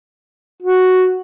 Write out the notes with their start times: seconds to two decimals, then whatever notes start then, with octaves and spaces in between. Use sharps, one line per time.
0.62 F#4